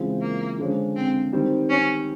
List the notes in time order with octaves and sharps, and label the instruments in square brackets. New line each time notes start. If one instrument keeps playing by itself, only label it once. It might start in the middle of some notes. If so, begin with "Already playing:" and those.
Already playing: [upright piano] C#3 E3 G#3 C4 F4
[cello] A#3
[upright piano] D3 F3 G#3 C#4
[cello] C4
[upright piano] D#3 G3 C4
[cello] C#4